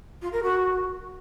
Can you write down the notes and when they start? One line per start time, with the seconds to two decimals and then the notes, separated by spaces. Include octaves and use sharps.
0.22 F4
0.33 A#4
0.43 F#4